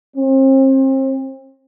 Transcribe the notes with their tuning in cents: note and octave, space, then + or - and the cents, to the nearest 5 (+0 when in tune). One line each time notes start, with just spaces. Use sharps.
C4 +35